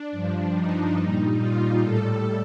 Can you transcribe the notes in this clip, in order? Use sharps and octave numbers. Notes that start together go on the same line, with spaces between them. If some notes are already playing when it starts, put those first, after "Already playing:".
Already playing: D4
G2 F3
D#4
A#2 G3 D#4
F4
A2 G3 A4